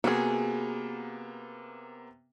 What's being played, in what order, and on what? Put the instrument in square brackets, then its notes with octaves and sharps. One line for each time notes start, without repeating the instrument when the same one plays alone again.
[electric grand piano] C3 A#3 B3 [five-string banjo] F#4 G#4